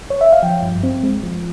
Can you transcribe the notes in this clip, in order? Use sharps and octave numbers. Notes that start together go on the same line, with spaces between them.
C#5
E5
F5
F3 G5
G2
C4
G#3
F3